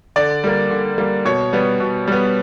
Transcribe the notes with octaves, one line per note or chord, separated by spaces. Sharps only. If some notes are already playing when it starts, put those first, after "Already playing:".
D3 D5
G3 A#3
D3
G3 A#3
B2 C#5
G3 B3
B2
G3 B3